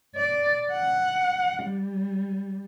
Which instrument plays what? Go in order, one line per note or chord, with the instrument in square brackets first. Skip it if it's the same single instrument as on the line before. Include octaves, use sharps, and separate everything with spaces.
[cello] D5
F#5
G3